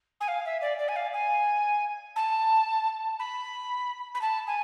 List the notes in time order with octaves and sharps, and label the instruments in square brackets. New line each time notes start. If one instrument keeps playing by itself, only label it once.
[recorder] G#5
F5
E5
D5
D5
G#5
F5
G#5
A5
B5
B5
A5
G#5